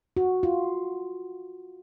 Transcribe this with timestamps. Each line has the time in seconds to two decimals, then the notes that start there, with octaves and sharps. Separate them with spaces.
0.17 F#4
0.43 F4